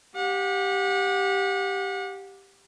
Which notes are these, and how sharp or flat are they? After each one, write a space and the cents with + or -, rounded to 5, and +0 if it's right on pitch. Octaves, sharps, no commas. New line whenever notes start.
G4 +0 F#5 -35